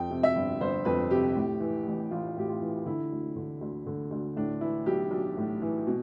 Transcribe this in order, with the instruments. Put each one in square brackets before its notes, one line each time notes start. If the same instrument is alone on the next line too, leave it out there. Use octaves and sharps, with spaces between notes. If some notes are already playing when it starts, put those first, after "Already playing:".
Already playing: [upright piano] F2 G5
C3
E5
G1
G1 C5
F2 B4
C3 G4
A2
E3
A1
A1 F4
A2 G4
F4
E3
D3 E4
D2
D3
D2
D3
D2
A2 D4
E3 E4
B1 G4
B1
A2
E3
B2